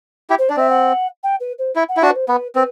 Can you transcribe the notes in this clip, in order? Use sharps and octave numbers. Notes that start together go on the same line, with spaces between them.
E4 G4
C5
D4 D5
C4 E5
F#5
G5
B4
C5
E4
F#5
E4
D4 F#4 E5
B4
C5
B3 B4
C4 B4